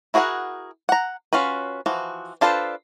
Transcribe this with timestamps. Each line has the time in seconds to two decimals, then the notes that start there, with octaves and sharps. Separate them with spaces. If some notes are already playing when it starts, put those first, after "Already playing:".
0.14 E4 F#4 G#4 A#4 F#5
0.89 F#5 A#5
1.33 C#4 F4 F#4 B4
1.86 E3 F3 F#4
2.41 D4 F4 A4 B4 C5